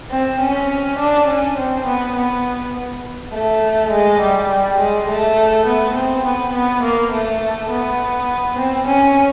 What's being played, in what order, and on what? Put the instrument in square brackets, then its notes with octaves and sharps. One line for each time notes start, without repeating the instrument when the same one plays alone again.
[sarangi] C4
C#4
D4
C#4
C4
B3
B3
A3
G#3
G3
G3
G#3
A3
B3
C4
B3
B3
A#3
A3
B3
C4
C#4